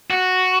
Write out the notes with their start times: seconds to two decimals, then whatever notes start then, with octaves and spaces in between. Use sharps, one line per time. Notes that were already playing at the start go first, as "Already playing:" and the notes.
0.10 F#4